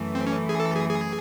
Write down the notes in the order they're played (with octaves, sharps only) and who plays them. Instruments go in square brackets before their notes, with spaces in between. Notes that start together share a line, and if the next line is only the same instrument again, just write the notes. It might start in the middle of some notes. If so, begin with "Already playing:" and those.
Already playing: [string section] F#2 E3 A3
[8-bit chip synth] C4
C#4
G#4
A4
G#4
G#4